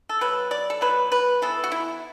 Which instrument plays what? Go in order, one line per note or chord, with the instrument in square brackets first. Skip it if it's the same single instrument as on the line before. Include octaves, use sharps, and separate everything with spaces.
[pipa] A4
B2 F#3 B4
D5
A4
B2 F#3 B4
B4
E3 B3 A4
F#4
E4